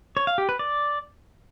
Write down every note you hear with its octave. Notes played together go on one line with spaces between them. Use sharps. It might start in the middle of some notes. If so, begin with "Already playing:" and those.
C#5
F5
G4
B4
D5